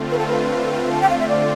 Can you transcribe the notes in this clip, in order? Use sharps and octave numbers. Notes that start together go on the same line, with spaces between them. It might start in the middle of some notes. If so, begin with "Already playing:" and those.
Already playing: D3 A3 C4 F4
B4
A4
B4
A5
G5
F5
E5
D5